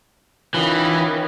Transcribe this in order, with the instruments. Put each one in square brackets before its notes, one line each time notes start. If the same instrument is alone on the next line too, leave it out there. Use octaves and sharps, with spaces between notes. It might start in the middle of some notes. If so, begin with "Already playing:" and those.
[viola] D#3 C#4 [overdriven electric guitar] E3 [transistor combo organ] F4 B5